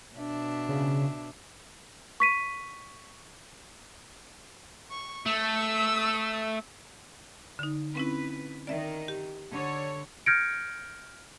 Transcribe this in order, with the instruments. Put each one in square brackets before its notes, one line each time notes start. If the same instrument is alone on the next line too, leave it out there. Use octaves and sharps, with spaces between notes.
[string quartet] B2 D4 E5
[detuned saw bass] C#3
[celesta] C#6 B6 D#7
[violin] C#6
[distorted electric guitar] A3 [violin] E6
[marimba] D3 D#4
[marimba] C4 C#4 E4 [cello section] B4
[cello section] D#3 [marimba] D5 E5
[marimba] G4
[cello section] D3 C#5
[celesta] F6 G6 G#6 A#6 C#7 D7